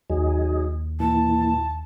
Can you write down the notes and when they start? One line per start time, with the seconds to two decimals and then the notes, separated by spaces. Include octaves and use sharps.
0.10 D#2 F#3 D#4 G#4
1.00 A#2 E3 A5